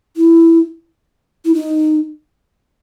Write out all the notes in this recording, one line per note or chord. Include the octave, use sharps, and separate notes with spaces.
E4
E4
D#4